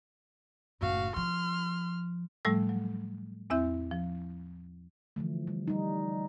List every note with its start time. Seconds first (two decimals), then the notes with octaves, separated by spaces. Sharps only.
0.81 F#1 A2 F#4 F5
1.16 F3 C6 F6
2.45 A2 F3 G3 A3 A4 E6
2.69 F#3
3.50 E2 C4 E4 E5 G6
3.91 F3
5.16 D3 E3 F3 A3
5.47 G3
5.68 G3 D#4